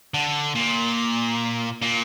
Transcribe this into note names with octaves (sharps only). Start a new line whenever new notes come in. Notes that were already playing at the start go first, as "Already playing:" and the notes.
D3
A#2
A#2